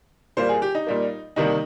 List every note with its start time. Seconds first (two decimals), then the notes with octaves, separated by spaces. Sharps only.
0.37 A#2 G3 A#3 C5
0.49 G#4
0.62 G4
0.75 D#4
0.87 A#2 G3 A#3
1.36 C3 D#3 G3 A#3 D#4